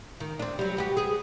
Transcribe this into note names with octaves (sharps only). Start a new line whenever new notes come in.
D#3
C4 D4
F#3 G3
B3 F#4 G4
G#4